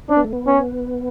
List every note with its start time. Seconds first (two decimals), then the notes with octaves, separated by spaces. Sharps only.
0.09 C#4 D4
0.17 B3
0.25 A3
0.33 B3
0.47 C#4